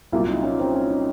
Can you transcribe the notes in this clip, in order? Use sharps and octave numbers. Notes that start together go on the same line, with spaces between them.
C2 A#2 F#3 A#3 F4
D#4
C#4
C4
C#4
D#4